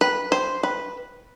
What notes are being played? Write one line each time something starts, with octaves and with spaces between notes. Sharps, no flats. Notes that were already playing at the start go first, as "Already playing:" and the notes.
B4
C5
B4